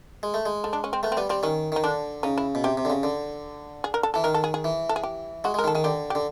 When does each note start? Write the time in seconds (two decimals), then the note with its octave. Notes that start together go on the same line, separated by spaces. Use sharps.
0.23 G#3
0.34 A3
0.46 G#3
0.64 A3
0.73 D4
0.84 C#4
0.93 C4
1.03 A3 B3
1.12 C4
1.17 G3 B3
1.30 G3 C4
1.43 D#3 C#4
1.72 D#3 D#4
1.84 D3 D4
2.23 C#3 D#4
2.38 E4
2.55 B2
2.64 C3 G4
2.77 C3
2.85 D3
2.90 C#3
3.03 D3
3.84 G#4
3.94 A#4
4.03 A4
4.14 E3 A4
4.24 D#3 A#4
4.34 A4
4.44 G#4
4.54 G#4
4.64 E3
4.89 A4
4.96 G#4
5.03 G4
5.44 G#3 F#4
5.54 G#3 A#4
5.64 D#3
5.67 A4
5.75 D#3 G#4
5.84 D3 G4
6.10 G4
6.15 D3